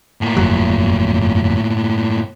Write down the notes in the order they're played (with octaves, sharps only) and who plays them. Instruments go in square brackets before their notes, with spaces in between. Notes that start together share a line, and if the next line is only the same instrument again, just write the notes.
[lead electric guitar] A2 A#3
[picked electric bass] G1 F2 F#3